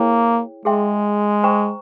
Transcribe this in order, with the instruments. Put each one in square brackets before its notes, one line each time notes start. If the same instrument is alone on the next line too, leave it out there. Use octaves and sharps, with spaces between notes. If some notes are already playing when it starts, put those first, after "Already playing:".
Already playing: [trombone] A#3 [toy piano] E4 G#4 C#5 G5
[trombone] G#3 [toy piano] G#4 E5 G5 C6
[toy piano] C5 G5 A#5 C#6